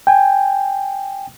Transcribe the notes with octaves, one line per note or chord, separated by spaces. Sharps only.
G5 G#5